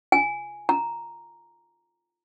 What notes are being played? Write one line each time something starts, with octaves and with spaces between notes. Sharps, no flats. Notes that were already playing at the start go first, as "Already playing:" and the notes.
G#5
A#5